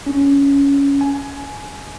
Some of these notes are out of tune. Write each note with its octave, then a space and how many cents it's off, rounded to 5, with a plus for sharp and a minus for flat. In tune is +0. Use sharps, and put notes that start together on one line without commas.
C#4 +15
G#5 +20